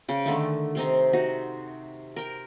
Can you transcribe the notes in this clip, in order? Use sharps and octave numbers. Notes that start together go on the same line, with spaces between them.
C#3 G5
D3 D#3 A3
C3 C4 D#4
D#4 F#4
A#4 G5